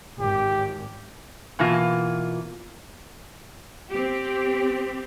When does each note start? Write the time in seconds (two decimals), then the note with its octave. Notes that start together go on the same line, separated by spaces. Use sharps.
0.20 G#1 G4
1.59 B2 E3 A#3 F4
3.91 C4 G4